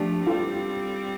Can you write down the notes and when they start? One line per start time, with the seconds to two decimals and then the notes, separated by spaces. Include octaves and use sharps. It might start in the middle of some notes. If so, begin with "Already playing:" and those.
Already playing: F3 A3 D4 G4
0.26 G3 C4 F4 A4